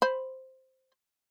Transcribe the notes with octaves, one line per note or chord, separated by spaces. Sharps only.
C5 B5